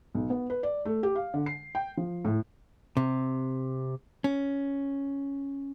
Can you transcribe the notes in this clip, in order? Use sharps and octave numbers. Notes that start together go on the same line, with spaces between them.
B1
B3
B4
D5
A3
G4
F5
D3
C7
G5
F3
A2
C3
C#4